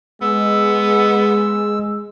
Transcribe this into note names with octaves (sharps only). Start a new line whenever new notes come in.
G#3 B3 E6